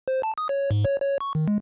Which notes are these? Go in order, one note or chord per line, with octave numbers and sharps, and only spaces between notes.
C5
A5
D#6
C#5
G#2
C#5
C#5
C#6
D#3
G#3